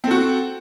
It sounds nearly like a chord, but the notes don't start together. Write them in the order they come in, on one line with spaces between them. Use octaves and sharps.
C4 A4 F#4